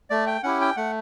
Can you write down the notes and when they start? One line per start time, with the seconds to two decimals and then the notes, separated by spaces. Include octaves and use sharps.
0.10 A3 D5
0.27 G5
0.43 C#4 E4 G4 F#5
0.61 G5
0.77 A3 F#5